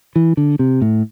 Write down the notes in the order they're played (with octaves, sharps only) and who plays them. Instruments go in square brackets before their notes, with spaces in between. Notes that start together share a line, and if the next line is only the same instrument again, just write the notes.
[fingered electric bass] E3
D3
C3
A2